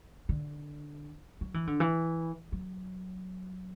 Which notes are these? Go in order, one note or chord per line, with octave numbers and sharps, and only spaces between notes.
D3
F#3
E3
D3
E3
F#3